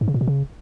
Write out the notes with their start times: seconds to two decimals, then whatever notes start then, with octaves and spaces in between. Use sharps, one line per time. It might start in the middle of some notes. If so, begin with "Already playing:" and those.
0.01 G#2
0.08 C#3
0.14 A#2
0.21 B2
0.27 C#3